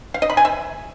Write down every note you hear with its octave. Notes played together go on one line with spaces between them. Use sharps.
F5
D#5
B5
G#5
E5